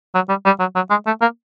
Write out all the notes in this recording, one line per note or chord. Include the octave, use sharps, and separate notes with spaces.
F#3
G3
G3
F#3
F#3
G#3
A3
A#3